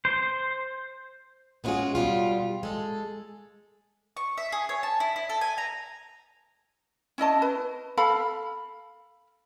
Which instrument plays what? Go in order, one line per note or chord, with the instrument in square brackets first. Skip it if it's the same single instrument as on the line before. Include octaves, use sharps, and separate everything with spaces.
[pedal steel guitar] C5
[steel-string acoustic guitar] G#3 B3 C#4 F4 F#4 G#4
B2 G3 F4
G#3 A4
[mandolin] C#6
E5
G#4
C#5
A5
E4
E4
A4
G#5
A#5
[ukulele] C#4 E4 D#5 A5
B4
A4 F5 B5